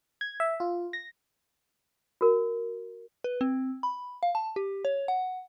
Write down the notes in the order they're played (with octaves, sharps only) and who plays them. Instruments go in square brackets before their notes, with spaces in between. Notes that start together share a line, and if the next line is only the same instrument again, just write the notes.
[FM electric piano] G#6
E5
F4
A#6
[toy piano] F#4 A#4
[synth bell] B4
C4
B5
F5
A5
G4
C#5
F#5